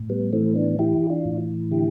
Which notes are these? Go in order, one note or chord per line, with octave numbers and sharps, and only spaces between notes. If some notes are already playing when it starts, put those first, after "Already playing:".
Already playing: A2
G3 B3
E3 A3 C4
B3 D4
E3 E4 G4
D4 F4
A2
D3 E4 G4